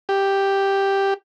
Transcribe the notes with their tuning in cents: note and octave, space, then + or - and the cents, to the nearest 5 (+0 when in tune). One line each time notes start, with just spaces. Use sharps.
G4 +0